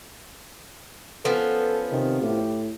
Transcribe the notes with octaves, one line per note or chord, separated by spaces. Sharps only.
F3 B3 C#4 A4
C3 D#3
A2 G4